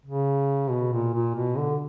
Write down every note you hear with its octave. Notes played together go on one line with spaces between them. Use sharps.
C#3
B2
A#2
A#2
B2
D3